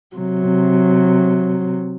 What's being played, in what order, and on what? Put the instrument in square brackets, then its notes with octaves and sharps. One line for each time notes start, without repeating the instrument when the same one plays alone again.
[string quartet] C3 F#3